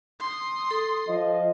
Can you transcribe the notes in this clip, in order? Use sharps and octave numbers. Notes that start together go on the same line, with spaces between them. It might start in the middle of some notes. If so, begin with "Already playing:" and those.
C6 D#6
A4
F3 D#5